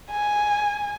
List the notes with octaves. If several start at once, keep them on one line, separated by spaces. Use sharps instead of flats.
G#5